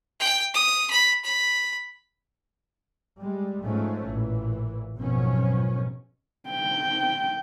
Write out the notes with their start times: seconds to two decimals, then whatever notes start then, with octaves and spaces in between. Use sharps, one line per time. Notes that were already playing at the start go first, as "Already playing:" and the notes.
0.20 G5
0.54 D#6
0.90 B5
1.24 B5
3.19 G3 G#3
3.65 G#2 F3 G#3 A3 C#4
4.06 A1 A#2 E3
4.97 G#1 F#2 B2 F3 F#3 C#4
6.50 G5